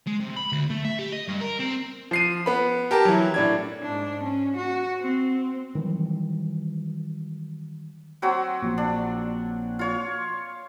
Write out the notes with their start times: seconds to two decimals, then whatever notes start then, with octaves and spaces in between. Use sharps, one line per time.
0.07 G#3
0.20 C3
0.36 B5
0.52 D2
0.70 A3
0.85 E5
0.99 G4
1.13 D#5
1.28 G2
1.41 A#4
1.60 C4
2.11 F3 C7 D#7
2.46 B3 B5
2.91 G4 A#4 A5
3.05 E3 F#3
3.34 A2 D4 G#6
3.83 G#2 D4
4.24 C#4
4.57 F#4
5.01 C4
5.75 D#3 E3 F#3 G3
8.22 F#3 C4 F#4
8.62 A#1 A#2
8.78 D4
9.79 F4 C#5